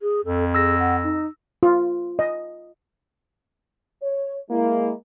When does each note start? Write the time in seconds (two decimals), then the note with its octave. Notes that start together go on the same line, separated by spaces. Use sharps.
0.01 G#4
0.25 F2 A4
0.55 G#4 E6 A#6
0.79 F#5
1.03 D#4
1.63 F4
2.19 D#5
4.03 C#5
4.50 G#3 A#3 E4